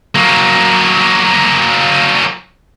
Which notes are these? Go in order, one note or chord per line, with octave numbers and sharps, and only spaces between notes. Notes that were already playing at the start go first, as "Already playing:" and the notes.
F#3 A#3